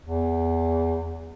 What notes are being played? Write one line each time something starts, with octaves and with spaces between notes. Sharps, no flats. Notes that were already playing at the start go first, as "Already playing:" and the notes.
E2